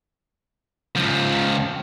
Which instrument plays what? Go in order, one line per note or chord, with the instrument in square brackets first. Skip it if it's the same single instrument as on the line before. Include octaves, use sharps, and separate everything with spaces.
[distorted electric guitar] C#2 F3